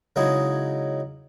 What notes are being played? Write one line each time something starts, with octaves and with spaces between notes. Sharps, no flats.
C#3 F#3 G#3 D#4 E4 G#4